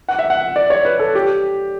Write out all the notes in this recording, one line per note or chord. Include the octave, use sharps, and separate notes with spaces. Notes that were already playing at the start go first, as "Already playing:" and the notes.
F#5
E5
F#5
D5
C#5
B4
A4
G4